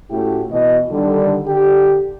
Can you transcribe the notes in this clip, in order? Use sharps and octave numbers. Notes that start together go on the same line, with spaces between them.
A2 A3 C#4 E4 F#4 G4
B2 E3 F#4 D#5
D3 D#3 G3
D3 G4